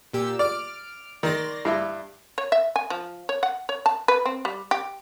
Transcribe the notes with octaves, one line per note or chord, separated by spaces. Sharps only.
A#2 G4 E6
D5 F6 D7
D#3 D5 C6 A#6
G2 E4
C#5
E5
G#5
F3
C#5
F#5
C#5
A5
B4
C4
G3
G4